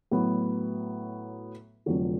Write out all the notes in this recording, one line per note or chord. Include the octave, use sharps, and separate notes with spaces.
A2 F#3 B3
F1 F2 D3 F#3